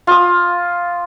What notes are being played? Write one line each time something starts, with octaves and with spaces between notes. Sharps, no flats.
F4 D#6